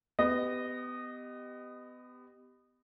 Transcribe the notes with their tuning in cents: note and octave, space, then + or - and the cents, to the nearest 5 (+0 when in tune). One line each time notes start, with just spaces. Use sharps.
B3 +25 G4 +0 D#5 -15